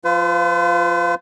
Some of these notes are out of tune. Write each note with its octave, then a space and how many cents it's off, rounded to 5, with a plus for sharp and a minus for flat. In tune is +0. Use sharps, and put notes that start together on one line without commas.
F3 +0 F4 -5 B4 +45